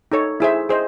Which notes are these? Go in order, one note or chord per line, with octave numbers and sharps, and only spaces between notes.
D#4 A4 C#5
E4 G#4 C5 E5
G#4 C5 D#5